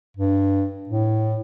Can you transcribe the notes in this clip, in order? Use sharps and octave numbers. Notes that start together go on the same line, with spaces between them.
G2
A2